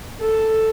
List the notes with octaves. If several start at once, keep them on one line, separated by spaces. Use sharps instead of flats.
A4